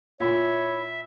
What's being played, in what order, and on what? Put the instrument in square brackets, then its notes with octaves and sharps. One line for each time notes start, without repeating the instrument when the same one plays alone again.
[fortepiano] A#2 [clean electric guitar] E4 [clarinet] C#5 [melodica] E5